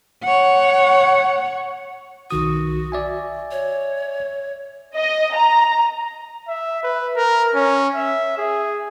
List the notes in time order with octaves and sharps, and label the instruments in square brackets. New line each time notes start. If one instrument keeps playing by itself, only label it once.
[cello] C#5 F#5
[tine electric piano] B1 D#3 D#6 [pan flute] F#4
[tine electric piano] D5 E5 G#5
[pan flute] C#5
[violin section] D#5
A#5
[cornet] E5
B4
A#4
C#4
E5
G#4